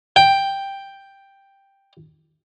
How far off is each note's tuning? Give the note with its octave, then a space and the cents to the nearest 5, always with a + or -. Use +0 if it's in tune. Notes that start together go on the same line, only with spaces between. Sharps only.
G5 +5